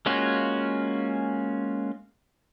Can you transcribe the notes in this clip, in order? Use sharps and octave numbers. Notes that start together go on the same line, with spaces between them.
G#3 A#3 C#4 F4 F#4